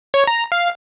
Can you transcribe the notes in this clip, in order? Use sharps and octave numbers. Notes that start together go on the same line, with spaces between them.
C#5
A#5
F5